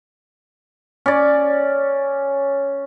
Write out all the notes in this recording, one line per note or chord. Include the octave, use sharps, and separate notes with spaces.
C#4 D5